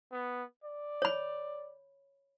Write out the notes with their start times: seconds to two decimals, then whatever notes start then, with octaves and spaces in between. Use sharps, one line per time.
0.12 B3
0.64 D5
1.02 C#5 B5